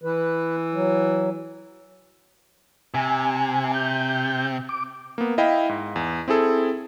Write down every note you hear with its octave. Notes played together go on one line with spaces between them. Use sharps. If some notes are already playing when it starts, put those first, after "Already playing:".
E3 B4
F#3
C3 G#5
G6
D6
A#3 B3
E4 D#5 F5 G5 B5
G#2
E2
C4 E4 G#4 A4